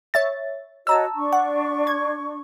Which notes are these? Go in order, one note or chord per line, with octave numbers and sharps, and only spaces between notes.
C#5 E5 A6
F#4 C#5 D#5 A5 A#5 E6
D4 C#6
F#5
G#6